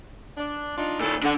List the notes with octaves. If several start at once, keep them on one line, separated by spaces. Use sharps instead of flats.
D4
D4 D#4 F4
A#2 D#3 E4 A4
D3 D4 F#5